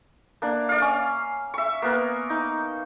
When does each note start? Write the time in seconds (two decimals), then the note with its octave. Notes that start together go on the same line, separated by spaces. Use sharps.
0.42 A#3 D4
0.69 D5 F5
0.81 C#4
1.54 E5 C#6
1.82 A#3 B3 A#4
2.30 D#4